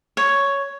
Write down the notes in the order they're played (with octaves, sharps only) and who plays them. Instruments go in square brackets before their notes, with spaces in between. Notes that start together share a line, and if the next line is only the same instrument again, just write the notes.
[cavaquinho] C#5